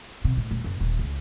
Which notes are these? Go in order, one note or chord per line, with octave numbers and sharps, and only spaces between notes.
C3
A2
D#1
F#1
D#1
C#2